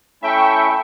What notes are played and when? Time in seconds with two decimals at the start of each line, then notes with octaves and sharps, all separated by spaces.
0.22 A3 C#4 E4 E5 G5 C#6